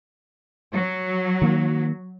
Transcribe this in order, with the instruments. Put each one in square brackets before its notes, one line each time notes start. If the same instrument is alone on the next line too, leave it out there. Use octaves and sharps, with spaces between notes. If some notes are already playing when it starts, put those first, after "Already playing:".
[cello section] F#3
[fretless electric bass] D#3 A#3